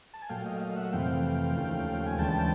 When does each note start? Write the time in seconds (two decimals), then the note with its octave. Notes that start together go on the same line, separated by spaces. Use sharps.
0.14 A5
0.22 G#5
0.29 A#2 F#3 A3 F5 G5
0.46 D#5 F5
0.61 D#5 F5
0.76 E5 F#5
0.92 F2 C3 E3 A3 F5 G5
1.56 D#2 C#3 F3 A3
2.07 G#5
2.18 D2 C#3 E3 G#3 G5 A5